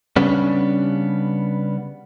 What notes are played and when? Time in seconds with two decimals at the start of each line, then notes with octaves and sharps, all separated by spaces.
0.16 C#3 G3 B3 C#4 D4